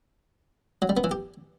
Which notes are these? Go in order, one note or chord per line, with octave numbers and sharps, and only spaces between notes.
F#3
G3
B3
E3
G4